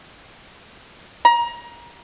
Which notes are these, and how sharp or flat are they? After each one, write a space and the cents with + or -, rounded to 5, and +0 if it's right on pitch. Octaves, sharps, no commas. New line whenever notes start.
A#5 +25